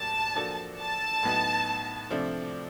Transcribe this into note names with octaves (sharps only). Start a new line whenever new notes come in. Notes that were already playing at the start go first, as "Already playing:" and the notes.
Already playing: A2 F#3 A#3 D4 G4 A5
F3 A#3 D4 F#4 A4
A5
A2 F#3 B3 D#4 F#4
C3 F3 A3 D4